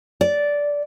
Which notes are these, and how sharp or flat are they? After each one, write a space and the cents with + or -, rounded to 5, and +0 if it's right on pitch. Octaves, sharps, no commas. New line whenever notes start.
D5 -10